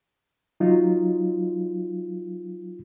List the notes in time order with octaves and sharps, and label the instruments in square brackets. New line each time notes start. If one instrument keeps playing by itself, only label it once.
[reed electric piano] F#3 D#4 F4